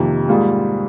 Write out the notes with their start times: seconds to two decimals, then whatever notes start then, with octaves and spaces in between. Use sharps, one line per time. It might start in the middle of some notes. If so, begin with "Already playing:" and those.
Already playing: F2 C3 D#3 A#3
0.28 G#2 G3 A#3 F4 G#4